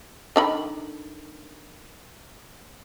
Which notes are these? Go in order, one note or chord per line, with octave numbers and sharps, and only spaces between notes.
D3 D#3 B5